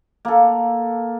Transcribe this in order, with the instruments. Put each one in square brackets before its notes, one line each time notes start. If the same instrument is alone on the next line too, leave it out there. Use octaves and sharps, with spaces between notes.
[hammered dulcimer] A#3 A4